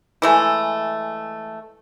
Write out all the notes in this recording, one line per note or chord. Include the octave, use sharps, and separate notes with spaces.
E3 G#3 A3